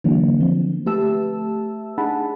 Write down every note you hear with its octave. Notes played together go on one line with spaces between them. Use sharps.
D3 E3 F#3 A#3
D3 F3 C4
A3 G4 B4 E5 A5 E6
D4 D#4 G#4 F#5 A5 B5